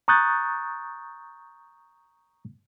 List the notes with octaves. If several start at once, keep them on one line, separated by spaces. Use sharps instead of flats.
A#5 C#6 D#6 F#6 G6 A6